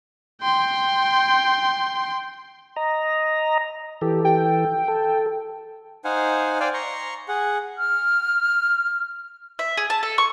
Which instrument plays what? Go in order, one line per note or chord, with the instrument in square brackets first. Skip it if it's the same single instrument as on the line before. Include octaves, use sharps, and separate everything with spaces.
[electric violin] G5 C6
[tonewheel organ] D#5 A#5
[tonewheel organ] E3 A4 [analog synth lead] G4
[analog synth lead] G5
[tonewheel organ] A4
[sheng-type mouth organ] D#4 C5 F5 F#5 G#5
C5 D5 F5 G5 G#5
A#5 C6 C#6
G#4 F#5
[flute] F6
[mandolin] E5
G#4
A5
A4
C#6